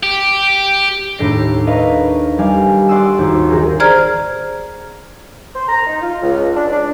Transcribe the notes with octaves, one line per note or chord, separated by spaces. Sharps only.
G4
D#2 A2 D4 D5 A#6 C7
A#4 B4 C#5 D#5 F5
G3 G4 D5 F5 G#5
D5 F#5 C6 C#6 D#6 E6
G#1 D#2
D#3 G4 G#4 A#4
G#4 C5 D5 A#5 F6 G#6
C5
A#5
D#4
F4
C#2
D4
D4